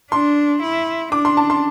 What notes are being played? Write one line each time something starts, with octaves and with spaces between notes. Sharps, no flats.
D4 C6
E4
D4 D6
C6
A5
C6